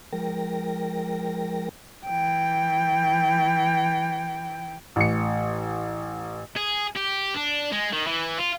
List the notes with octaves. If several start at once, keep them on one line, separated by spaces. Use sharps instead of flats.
F3 G#3 A#4 G5 A#6
E3 G5
A1 C#7
G#4
G4
D4
G#3
D#3
E3
F4